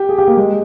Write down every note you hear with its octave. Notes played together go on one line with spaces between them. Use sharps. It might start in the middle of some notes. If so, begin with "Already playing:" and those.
Already playing: G4
G#4
G4
A#3
G#3